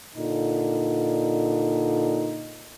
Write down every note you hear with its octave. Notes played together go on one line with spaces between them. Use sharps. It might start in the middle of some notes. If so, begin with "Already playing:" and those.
A#2 D3 D#4